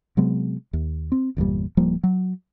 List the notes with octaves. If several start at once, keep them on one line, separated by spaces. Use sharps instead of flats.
C3 F#3 G#3 B3
D#2
C4
G1 E2 A#2 G3
D1 F3 G3 A#3
F#3